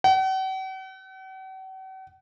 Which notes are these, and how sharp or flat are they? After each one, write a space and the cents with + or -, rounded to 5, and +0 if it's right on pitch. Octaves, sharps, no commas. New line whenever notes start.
F#5 +45